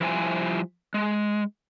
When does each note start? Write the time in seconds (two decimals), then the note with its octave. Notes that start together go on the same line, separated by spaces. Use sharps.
0.01 F3 G3 E4 C5 G5 G#5
0.94 G#3